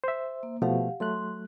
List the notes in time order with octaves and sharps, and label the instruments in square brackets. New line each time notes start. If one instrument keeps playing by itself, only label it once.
[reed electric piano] C5 E5
[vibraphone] A#3
[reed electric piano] B2 F3 A3 [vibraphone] G4 F5 F#5
[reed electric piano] F#3 A3 F#6 [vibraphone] C6